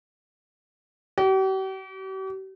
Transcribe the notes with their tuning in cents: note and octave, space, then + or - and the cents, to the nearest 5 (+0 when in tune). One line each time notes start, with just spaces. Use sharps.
G4 -45